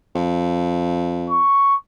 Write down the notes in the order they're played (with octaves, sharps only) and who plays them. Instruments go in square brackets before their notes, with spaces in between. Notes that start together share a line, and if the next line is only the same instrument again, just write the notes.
[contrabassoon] F2
[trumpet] C#6